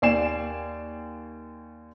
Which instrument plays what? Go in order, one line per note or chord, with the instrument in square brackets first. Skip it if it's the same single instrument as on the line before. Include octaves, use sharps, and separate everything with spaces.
[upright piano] D#2 D5 G#5 C7 E7